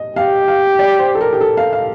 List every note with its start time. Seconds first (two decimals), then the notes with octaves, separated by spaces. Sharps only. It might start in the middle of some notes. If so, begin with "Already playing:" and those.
Already playing: D#5
0.16 G4 F5
0.48 F5
0.79 D5
0.99 C5
1.15 A4
1.21 A#4
1.33 G4
1.41 A4
1.57 F5
1.73 F5